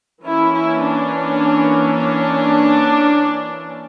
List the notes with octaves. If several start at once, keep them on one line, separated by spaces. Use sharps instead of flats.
E3 A#3 C#4 E4
E4
D4
D4